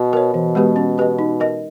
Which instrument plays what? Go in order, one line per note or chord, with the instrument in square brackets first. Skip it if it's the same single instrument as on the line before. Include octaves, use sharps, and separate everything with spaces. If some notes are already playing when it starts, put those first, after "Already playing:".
Already playing: [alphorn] B2
[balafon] A#4 C#5
[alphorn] B2 [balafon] E3
[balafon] G#3 B3 G4 B4
C#4
G4 B4 D#5
D#4
A#4 D#5